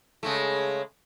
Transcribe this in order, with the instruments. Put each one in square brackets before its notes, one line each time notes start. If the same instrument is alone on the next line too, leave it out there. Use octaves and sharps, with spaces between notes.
[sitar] C#3 G#3 A3